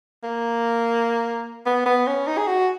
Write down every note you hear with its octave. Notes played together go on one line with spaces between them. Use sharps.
A#3
B3
B3
C#4
D#4
G#4
F#4